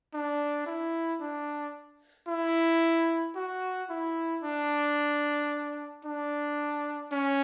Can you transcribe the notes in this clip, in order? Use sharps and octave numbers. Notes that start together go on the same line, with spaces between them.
D4
E4
D4
E4
F#4
E4
D4
D4
C#4